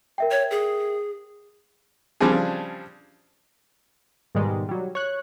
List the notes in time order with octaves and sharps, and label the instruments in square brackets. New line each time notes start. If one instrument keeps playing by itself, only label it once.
[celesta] A#4 E5 G5
[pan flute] C#5
G#4
[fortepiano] C#3 F3 G3 C4 D4 G#4
[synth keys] G#2 B2 D#3 G3 G#3
F#3 G3
C#5 F#6